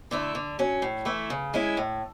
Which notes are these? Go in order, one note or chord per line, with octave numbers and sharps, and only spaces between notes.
D3 A3 E4
D3
F#3 C#4
A2
E3 A3 E4
C#3
G#3 C#4 E4
A2